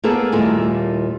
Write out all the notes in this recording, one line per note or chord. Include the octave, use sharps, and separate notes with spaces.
A#3 B3 G#4 A4 B4 D5
D#2 A#2 G3 A3 E4 G#5